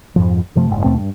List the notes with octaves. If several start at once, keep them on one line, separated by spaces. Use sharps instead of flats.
F2 G#2 F3
F#2 C3 F3 A3
F#1 G#2
D#2 B2 A3 C4
G2